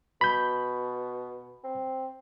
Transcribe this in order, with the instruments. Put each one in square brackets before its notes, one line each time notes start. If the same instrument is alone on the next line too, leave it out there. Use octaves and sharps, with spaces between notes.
[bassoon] B2 [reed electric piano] B5 G6
[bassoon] C4